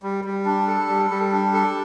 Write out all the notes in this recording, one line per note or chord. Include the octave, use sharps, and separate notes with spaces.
G3
G3
D4
A4
G3
G3
D4
A4